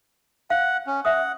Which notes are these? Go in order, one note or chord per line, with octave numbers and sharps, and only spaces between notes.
F5 F#5
C#4
E5 F#5 D#6